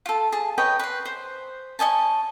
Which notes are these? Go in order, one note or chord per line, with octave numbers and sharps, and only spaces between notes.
F4 A4
G#4 A5
B4 C#5 D#5 G5
B4 C6
C5
C#5 D#5 G#5 A5